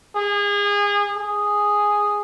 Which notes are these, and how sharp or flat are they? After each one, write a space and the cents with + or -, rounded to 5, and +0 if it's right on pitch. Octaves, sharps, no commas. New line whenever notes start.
G#4 -30
G#4 -5